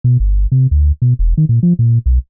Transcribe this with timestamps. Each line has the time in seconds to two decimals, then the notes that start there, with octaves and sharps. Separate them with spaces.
0.04 B2
0.20 G1
0.52 C3
0.71 D2
1.02 B2
1.19 E1
1.38 D#3
1.49 A#2
1.63 F3
1.79 A#2
2.06 B1